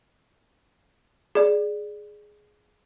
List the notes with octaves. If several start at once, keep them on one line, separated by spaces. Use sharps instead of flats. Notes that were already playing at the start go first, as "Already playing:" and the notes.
G#4 D5